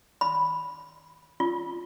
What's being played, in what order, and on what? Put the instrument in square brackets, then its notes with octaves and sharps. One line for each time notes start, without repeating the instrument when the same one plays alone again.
[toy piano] B5
F4